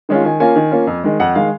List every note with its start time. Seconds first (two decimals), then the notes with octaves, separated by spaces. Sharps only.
0.09 D#3 G#3 C#4 F4
0.24 D#3 G#5
0.40 A#3 C#4 F4 G#5
0.56 D#3
0.71 A#3 C#4 F4
0.87 F2
1.04 D#3 G#3
1.20 F2 F#5
1.35 D#3 G#3 F5